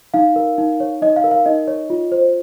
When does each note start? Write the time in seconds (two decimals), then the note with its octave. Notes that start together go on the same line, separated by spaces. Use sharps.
0.14 D#4 F5
0.36 A#4
0.58 D#4
0.80 C#5
1.02 D#4 D#5
1.16 F5
1.24 A#4
1.31 F5
1.46 D#4 D#5
1.68 C#5
1.90 F4
2.12 C5